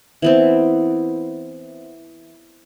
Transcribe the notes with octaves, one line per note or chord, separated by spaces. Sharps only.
E3 B3 C4